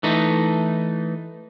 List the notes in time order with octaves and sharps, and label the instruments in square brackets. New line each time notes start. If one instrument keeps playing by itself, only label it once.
[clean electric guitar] E3 A3 D#4